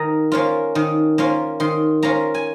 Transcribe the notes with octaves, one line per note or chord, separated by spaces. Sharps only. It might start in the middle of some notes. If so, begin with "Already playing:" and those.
Already playing: D#3 A#3 A#5
A#3 C#4 F4
D#3
A#3 C#4 F4
D#3 C6
A#3 C#4 F4 A#5
G#5